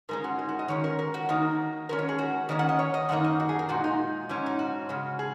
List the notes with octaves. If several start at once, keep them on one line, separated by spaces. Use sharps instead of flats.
G#2 G#3 C#4 A#4
F#4
D#4
F#4
D#5
D#3 G#3 C#4 C#5
A#4
A#4
F#4
D#3 A#3 D#4
D#3 G#3 C#4 A#4
C#5
G#4
F#4
D#3 A#3 C#4 D#5
F#5
D#5
C#5
D#5
F#2 D#3 A#3 D#4 F#5
D#5
F#4
G#4
A#4
A#2 G#3 D#4 F#4
D#4
G#2 F#3 C#4
D#4
F#4
C#3 G#3 C#4
G#4